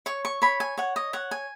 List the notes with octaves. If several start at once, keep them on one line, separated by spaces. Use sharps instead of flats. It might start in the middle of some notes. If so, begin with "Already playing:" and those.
C#5 C#6
C#6
C#5 B5
G#5
C#5 F#5
D#5
C#5 F#5
G#5